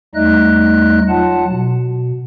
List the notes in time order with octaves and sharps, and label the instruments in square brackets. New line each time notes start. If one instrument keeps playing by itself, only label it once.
[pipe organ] E2 G3 A3 D#4 D#5 F#6
F#3 F4 F#5 A5
B2